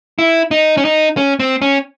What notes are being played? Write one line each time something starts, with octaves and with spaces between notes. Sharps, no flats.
E4
D#4
C#4
D#4
C#4
C4
C#4